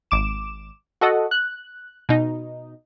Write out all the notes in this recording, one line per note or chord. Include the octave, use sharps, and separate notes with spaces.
G#1 D6 E7
F#4 A4 D#5 F#5
F#6
B2 D#4